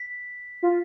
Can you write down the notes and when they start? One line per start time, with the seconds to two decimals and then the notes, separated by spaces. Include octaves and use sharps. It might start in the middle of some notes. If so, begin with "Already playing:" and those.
Already playing: B6
0.63 F4